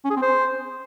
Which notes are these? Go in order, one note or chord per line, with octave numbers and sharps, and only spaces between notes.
C#4
G#4
C4
C5